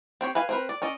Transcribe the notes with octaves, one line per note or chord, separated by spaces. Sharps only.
C4 G4 C#5
B4 F5 G#5
C4 A#4 B4
D5
C#4 D5 D#5